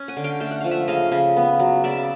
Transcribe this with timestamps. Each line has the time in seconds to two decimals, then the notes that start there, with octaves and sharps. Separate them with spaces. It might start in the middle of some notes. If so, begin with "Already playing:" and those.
Already playing: C#4
0.08 F#5 G#5
0.17 D3
0.24 F5 G5
0.40 A3 G5
0.51 F#5
0.60 F3 F5
0.71 E5 F#5
0.88 C#3 D#5 F5
1.12 C#3
1.36 B3
1.59 F#3
1.84 C#3 D5 E5